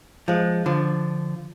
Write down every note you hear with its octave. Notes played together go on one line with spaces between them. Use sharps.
F3 G#3
D3 F3